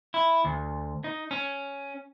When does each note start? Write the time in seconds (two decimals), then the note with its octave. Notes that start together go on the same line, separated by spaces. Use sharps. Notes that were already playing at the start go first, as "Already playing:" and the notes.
0.14 E4
0.45 D2
1.04 D#4
1.31 C#4